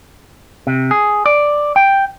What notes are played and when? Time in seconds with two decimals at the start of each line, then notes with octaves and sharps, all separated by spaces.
0.67 C3
0.91 G#4
1.26 D5
1.76 G5